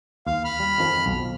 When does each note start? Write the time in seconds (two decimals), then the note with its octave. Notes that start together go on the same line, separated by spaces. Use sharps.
0.27 D#2 F5
0.44 B5 F6
0.60 G3
0.78 F2 D#3 F3
1.06 B1